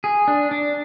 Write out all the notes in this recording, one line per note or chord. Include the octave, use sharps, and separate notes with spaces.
G#4
D4
D4